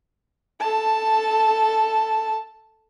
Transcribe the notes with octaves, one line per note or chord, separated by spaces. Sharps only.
A4 A5